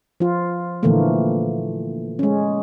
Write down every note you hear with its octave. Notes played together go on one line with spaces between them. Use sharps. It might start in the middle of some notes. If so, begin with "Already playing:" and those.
F3 F4
A#2 D3 E3 F3 A3 A#3
G#3 C#4